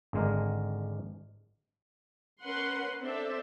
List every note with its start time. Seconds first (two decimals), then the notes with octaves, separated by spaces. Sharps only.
0.13 G#1 D3 G#3 A#4
2.42 C#4 A#4 B4 F#5 C6
3.01 C4 D4 A4 C5 E5